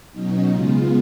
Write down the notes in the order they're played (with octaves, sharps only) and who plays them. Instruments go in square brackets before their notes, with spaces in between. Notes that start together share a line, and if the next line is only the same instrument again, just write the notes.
[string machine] B2 F#3 C#4 D#4
C#3 G#3 B3 F4